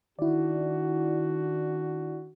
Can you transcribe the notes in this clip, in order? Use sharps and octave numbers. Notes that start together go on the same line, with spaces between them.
D#3 D4 E4 F#4 D5